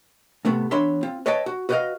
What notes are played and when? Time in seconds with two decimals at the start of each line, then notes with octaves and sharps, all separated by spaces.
0.45 A2 C3 A3 B3
0.71 E2 D4 C#5 E5 B5 C6
1.03 C4 F4
1.26 B4 C#5 D#5 E5 G5 A5
1.46 F#4
1.69 F#4 B4 C5 D5 D#5 F5